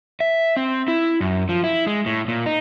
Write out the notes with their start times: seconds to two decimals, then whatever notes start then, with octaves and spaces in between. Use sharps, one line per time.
0.20 E5
0.57 C4
0.88 E4
1.21 F#2
1.49 F3
1.64 E4
1.87 G#3
2.06 A2
2.28 A#2
2.46 D#4